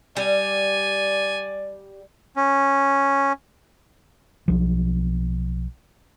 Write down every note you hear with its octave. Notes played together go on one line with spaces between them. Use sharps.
G3 D5 G#5
C#4
B1 F3